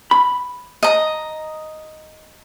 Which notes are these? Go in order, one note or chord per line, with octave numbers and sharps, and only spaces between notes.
B5
D#5 A#5